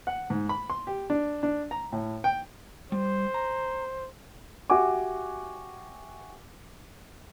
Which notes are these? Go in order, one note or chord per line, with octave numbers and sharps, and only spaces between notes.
F#5
G#2
B5
C6
G4
D4
D4
A#5
A2
G5
G3 C5
A#5
F#4 G4 E5 F#5 G#5 D6